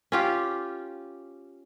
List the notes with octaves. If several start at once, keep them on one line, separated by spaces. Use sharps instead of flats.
C#4 F4 G4